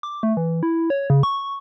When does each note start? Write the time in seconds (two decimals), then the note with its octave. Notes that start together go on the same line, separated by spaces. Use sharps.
0.03 D6
0.23 A3
0.37 E3
0.63 E4
0.90 C#5
1.10 C#3
1.23 C#6